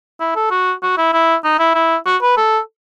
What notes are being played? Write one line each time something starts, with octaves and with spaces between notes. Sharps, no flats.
E4
A4
F#4
F#4
E4
E4
D#4
E4
E4
F#4
B4
A4